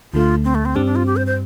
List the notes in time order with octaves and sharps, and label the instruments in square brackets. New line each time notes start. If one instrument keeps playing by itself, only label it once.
[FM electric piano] D2 D3 A3 [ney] F4
[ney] C4
A3
C4
[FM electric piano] G2 G3 C4 [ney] D4
[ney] D4
F4
G4
C5
C5